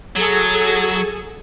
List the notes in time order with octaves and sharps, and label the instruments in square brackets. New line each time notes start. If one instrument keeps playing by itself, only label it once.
[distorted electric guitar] F#3 [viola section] G#4 A4 G#5